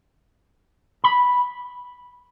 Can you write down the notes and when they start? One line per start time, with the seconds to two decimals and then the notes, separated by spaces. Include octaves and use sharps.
1.04 B5